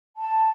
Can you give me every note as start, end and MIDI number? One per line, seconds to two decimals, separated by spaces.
0.17 0.49 81